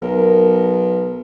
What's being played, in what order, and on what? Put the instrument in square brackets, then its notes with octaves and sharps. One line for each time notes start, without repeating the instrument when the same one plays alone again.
[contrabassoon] B1 [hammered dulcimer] A#4